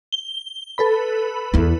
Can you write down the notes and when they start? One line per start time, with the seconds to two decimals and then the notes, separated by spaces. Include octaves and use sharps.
0.12 G7
0.78 A4 B4 B5
1.54 E2 E4